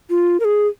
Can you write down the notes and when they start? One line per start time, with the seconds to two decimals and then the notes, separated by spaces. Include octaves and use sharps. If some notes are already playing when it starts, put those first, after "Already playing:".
0.10 F4
0.40 A#4
0.45 G#4